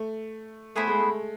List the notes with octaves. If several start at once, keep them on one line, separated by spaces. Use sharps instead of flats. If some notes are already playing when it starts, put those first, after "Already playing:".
Already playing: A3
A3 B3 E4 G#4 C5
G#3
A3